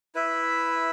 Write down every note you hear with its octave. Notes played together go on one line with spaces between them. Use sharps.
E4 B4 E5